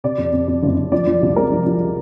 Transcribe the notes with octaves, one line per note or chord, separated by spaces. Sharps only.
C3 D5
F2
F2
F2
F#1
F#1
F3 D5
F3
C2
G#3 A#4
F3
F3